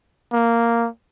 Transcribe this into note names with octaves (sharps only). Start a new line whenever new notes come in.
A#3